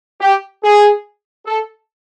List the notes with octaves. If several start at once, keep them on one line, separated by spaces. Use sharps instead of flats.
G4
G#4
A4